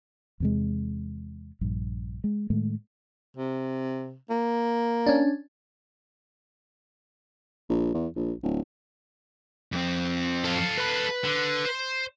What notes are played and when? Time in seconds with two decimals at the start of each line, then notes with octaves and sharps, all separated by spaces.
0.40 E2 C3 G#3
1.61 A#1 G2
2.24 G#3
2.50 A2 D#3 G#3 A3
3.37 C3
4.30 A#3
5.06 C#4 D4
7.69 A#1
7.94 E2
8.16 A#1
8.43 D1
9.72 F2 C4
10.44 A4 F5
10.78 B4 B5
11.24 D3
11.65 C5